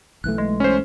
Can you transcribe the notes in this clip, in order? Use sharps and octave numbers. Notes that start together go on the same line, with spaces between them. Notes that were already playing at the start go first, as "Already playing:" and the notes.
B1 E3 A3 F#6
G#3
C#4 C5